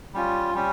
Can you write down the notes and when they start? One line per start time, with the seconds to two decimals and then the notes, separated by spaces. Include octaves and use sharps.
0.14 G3 C#4 F4
0.54 G3 C#4